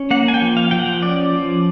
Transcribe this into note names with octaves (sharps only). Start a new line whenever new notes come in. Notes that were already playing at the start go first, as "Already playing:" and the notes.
Already playing: C#4
A#3 F#5
G#5
G5
F3
F5
F3 G5
F#5
C#4 D5
F3